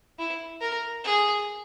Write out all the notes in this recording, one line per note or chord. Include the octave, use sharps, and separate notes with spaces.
E4
A#4
G#4